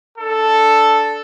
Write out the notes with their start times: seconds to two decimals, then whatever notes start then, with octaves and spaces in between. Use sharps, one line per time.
0.18 D4 A4